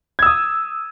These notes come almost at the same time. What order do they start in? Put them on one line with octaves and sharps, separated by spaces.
G#6 E6 D#6